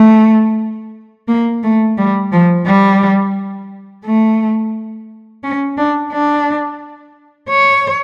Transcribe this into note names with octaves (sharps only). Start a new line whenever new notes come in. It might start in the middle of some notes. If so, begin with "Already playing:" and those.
Already playing: A3
A#3
A3
G3
F3
G3
A3
C#4
D4
D4
C#5